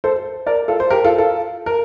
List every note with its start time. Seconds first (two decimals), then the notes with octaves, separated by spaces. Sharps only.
0.04 A4 C5
0.46 A#4 D5
0.68 F4 A4
0.80 C5
0.90 G4 A#4
1.04 F4 A4
1.18 F4 A4
1.66 A#4